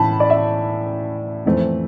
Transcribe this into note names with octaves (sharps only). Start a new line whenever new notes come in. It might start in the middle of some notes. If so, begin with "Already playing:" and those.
Already playing: A2 E3 A5 B5
D5
E5
F2 E3 A3 C4